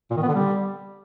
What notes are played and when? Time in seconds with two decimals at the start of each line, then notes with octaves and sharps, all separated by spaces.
0.11 A#2
0.16 D#3
0.22 B3
0.28 D3
0.34 G3